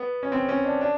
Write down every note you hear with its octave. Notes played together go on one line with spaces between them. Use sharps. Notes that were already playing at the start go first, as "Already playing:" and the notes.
Already playing: B3
C#4
C4
C#4
D4
D4